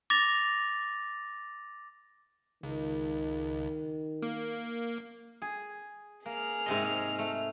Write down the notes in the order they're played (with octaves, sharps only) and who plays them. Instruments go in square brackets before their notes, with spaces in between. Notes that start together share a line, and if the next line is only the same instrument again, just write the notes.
[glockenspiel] D6 A6 A#6 F7
[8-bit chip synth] C#2 [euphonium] D#3
[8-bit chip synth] A#3
[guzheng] G#4
[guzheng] A#3 [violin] G#4 F6
[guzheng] G#2 C3 D#5
A3